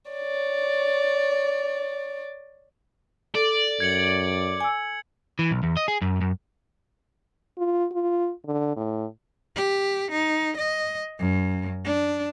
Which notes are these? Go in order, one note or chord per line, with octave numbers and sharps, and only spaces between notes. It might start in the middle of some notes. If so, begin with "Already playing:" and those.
C#5 D5
A4 D5
F#2 G#6 C#7 F#7
G#5 E6
E3
B1
E2
D#5
G#4
F#2
F#2
F4
F4
D3
A2
G4
D#4
D#5
F#2
D4